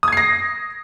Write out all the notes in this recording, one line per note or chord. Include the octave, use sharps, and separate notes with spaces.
D#6 G#6 A#6 C7